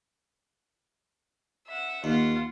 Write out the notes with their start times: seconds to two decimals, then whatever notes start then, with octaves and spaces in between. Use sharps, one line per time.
1.67 E5 F#5
2.04 D#2 F4 F#5